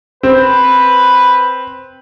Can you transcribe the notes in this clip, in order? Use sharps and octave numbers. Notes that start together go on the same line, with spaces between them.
C4 B4